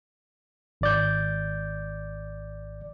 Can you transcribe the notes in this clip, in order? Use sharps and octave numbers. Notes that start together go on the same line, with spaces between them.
G#1 D5 G6